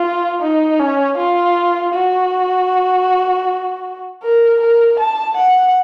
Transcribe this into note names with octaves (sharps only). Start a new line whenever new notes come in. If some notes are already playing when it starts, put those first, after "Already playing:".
Already playing: F4
D#4
C#4
F4
F#4
A#4
A#4
A5
F#5